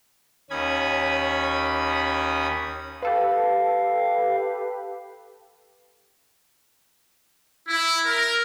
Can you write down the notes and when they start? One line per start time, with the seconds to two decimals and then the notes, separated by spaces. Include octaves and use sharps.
0.50 D#2 C#4 B5 D#6 G#6
3.02 G4 A4 B4 F5
7.67 E4
8.06 A#4